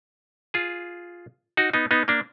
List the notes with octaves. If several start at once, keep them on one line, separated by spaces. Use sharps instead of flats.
F4 G#4
D#4 F#4
B3 D#4
B3 D#4
A#3 D4